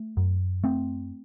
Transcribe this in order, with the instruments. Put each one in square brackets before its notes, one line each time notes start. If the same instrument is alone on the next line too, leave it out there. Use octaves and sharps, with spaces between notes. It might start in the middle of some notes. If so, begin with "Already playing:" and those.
Already playing: [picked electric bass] A3
F#2
A3 C4